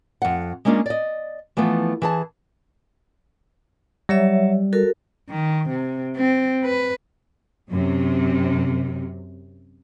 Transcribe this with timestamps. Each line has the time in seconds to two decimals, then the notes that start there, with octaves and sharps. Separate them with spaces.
0.22 F2 F#5
0.65 G#3 A#3 C#4 D4 F4
0.86 D5 D#5
1.57 E3 F3 A3 B3 E4
2.02 E3 G#4 A5
4.09 F#3 G3 C#5 E5
4.73 F#4 A4 A#4
5.30 D#3
5.69 C3
6.16 C4
6.64 B4
7.69 F#2 C3